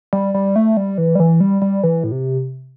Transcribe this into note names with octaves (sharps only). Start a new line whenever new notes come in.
G3
G3
A3
G3
E3
G3
E3
G3
G3
E3
A2
C3